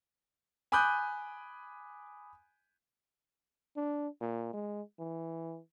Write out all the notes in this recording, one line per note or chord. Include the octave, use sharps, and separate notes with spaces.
G#5 B5 D6 D#6 F#6 G6
D4
A#2
G#3
E3